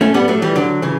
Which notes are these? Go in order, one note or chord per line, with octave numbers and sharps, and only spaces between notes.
A3 C#4
G3 B3
F#3 A3
E3 G3
D3 F#3
C#3 E3